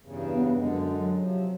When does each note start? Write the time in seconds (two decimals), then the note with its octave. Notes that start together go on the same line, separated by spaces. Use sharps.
0.04 E2 G2 C#3
0.34 B3
0.56 F#2 D3 G#3 D4
0.94 F#3
1.18 C3 F3